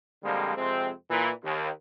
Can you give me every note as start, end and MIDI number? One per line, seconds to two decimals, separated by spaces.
0.24 0.53 50
0.24 0.53 53
0.24 0.53 55
0.24 0.53 56
0.24 0.53 58
0.24 0.53 60
0.57 0.91 41
0.57 0.91 48
0.57 0.91 56
0.57 0.91 60
1.10 1.30 46
1.10 1.30 52
1.44 1.69 39